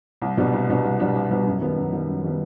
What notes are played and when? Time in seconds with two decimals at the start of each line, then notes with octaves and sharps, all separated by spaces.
0.22 C2
0.37 B2 G3 B3 D4
0.53 C2
0.69 B2 G3 B3 D4
0.84 C2
1.00 B2 G3 B3 D4
1.15 C2
1.30 B2 G3 B3 D4
1.46 F#2
1.61 D#3 G3 B3
1.77 F#2
1.93 D#3 G3 B3
2.08 F#2
2.24 D#3 G3 B3